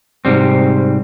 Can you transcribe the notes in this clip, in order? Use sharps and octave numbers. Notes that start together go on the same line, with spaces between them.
G#2 C3 G3 C4